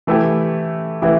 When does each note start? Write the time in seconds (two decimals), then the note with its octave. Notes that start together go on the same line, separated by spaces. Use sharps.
0.07 E3 A3 E4 G4
1.02 E3 A3 E4 G4